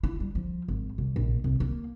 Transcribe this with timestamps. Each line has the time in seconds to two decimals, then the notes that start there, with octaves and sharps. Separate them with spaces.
0.03 E4
0.20 G3
0.35 F3
0.68 G#1
0.98 C2
1.16 A#1
1.44 C2
1.60 A#3